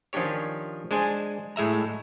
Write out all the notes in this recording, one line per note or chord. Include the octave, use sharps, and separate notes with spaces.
D#3 F3 C#4 D4 G4 C#5
G#3 D4 C5 G#5
A2 G#3 E5 A#5